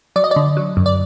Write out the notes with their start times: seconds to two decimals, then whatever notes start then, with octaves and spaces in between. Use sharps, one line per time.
0.16 F#3 D5
0.24 D#5
0.31 D5
0.36 D3
0.57 F#3
0.77 F#2
0.86 D5